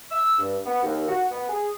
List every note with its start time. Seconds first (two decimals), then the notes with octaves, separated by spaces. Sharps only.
0.11 E6
0.39 G2
0.66 B3
0.83 D#2
1.08 F#4
1.31 B3
1.49 G#4